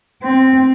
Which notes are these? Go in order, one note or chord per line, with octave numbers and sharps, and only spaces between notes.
C4